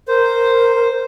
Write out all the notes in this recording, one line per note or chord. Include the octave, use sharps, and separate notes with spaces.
A#4 C5